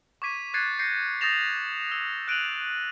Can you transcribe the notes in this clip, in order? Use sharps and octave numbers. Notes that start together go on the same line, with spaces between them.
C#6 D6 G#6 B6 D#7
F#6 G#6 A6 C7 C#7 D#7
G6 A#6 C7 C#7
D#6 G6 A6 A#6 E7 F7
E6
F#6 D7 D#7 F7 F#7